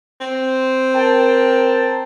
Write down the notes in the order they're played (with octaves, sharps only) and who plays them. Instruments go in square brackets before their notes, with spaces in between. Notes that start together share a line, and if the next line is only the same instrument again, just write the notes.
[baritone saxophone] C4
[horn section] A#4 G5 A5